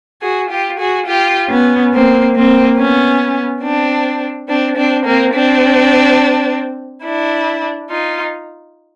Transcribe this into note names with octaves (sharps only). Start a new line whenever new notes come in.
F#4 G#4
F4 G4
F#4 G#4
F4 G4
B3 C#4
A#3 C4
A#3 C4
B3 C#4
C4 D4
C4 D4
C4 D4
A#3 C4
C4 D4
D4 E4
D#4 F4